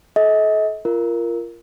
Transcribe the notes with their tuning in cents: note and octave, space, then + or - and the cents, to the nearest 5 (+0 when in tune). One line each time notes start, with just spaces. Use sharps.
A4 -35 D#5 +40
F4 -25 A#4 +0